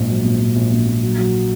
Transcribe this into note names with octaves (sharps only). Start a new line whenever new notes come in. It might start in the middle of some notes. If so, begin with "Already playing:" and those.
Already playing: A#1 G#2
F#3
A#1
A#1
A#1
A#1
A#1
F#3
F#3